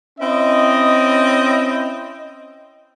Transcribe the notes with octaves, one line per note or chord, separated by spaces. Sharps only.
C4 C#4 E4 D#5